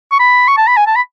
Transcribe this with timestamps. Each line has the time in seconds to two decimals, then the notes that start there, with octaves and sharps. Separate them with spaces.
0.11 C#6
0.19 B5
0.48 C#6
0.57 A5
0.67 B5
0.77 G#5
0.86 A5
0.96 B5